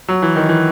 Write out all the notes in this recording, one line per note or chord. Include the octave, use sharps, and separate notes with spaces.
F#3
E3
D#3
E3